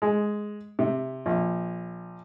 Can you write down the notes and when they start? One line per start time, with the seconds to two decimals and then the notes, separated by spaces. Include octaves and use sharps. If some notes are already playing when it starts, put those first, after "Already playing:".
0.02 G#3
0.79 C3
1.26 A#1